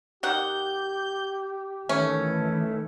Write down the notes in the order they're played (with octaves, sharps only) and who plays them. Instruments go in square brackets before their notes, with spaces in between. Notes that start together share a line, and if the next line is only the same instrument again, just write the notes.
[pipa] D#3 F#5 [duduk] G4 [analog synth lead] G6
[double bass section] D#3 E3 [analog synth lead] A3 [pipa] C#4